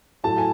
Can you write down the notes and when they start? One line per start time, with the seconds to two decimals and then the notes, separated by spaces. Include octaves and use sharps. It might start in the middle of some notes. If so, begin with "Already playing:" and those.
0.23 A2 F#3 A3 A5
0.38 G#5